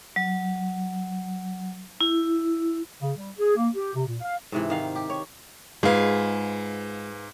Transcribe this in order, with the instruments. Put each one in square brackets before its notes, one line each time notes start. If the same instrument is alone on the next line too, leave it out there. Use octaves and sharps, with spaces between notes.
[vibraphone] F#3
E4
[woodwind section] C#3
G3
G#4
A#3
G4
C3
A#2
F5
[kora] G#2 C3 E3
D#3 F5
G4
C#5
[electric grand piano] G#2 F5 [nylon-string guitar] G#3 F4 [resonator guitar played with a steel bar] G#4 B4